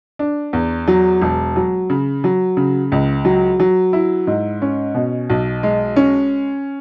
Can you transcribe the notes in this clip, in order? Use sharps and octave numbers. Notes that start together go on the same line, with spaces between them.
D4
E2
F#3
E1
F#3
C#3
F#3
C#3
C#2
F#3
F#3
E4
G#2
C#4
B2
B1
G#3
C#4